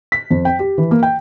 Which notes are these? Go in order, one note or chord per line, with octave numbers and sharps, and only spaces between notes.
B6
F2
G5
G4
E3
A#3
G5